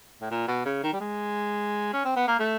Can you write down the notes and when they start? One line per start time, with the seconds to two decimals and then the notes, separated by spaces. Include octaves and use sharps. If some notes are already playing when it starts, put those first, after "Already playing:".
0.21 A2
0.31 A#2
0.48 B2
0.65 C#3
0.83 D#3
0.93 G3
1.00 G#3
1.93 C#4
2.05 C4
2.16 B3
2.28 A#3
2.39 A3